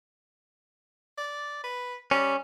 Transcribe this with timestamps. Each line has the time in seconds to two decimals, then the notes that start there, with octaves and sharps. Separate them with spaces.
1.18 D5
1.64 B4
2.11 G3 C#4